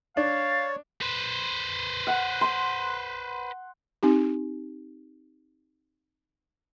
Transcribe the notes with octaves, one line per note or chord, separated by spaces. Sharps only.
D4 C#5 F5 A6
B4 C5
F#5
C6
C4 D#4 G4